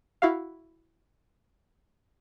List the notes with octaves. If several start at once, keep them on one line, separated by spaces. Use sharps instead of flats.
E4 F#4 F5